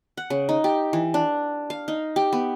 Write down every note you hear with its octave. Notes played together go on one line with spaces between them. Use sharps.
F#5
C#3
D#4
G4
E3
D4
F5
D#4
G4
B3